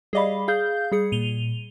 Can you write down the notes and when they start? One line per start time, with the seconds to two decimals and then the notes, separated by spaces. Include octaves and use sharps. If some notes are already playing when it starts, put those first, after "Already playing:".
0.13 G3 G#4 D5 D#5 F5 B5
0.48 G#4 F5 G6
0.92 G3 G#4 C#7
1.12 A#2 D#7 F7 G7